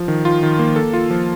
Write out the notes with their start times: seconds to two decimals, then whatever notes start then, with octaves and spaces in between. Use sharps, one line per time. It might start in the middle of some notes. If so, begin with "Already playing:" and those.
Already playing: F3
0.08 D#3
0.25 F4
0.43 D#3
0.59 A#3
0.76 A4
0.93 F4
1.10 F3